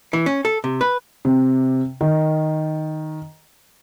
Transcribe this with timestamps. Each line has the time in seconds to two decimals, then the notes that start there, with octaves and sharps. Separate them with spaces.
0.13 E3
0.26 C#4
0.45 A4
0.64 C3
0.81 B4
1.25 C3
2.01 D#3